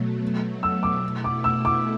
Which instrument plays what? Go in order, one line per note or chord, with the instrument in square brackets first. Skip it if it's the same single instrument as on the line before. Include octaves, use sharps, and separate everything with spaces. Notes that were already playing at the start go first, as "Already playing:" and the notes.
Already playing: [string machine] B2 F#3 A3
[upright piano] E6
D6
[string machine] B2 A3 E4
[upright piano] D6
E6
D6